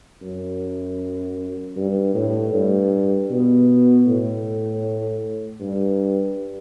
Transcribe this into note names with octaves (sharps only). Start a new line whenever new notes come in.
F#2
G2
A2
G2
B2
A2
G2